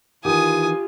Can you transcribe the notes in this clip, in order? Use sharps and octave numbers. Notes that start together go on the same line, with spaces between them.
D#3 E3 F4 G4 G#5 D#6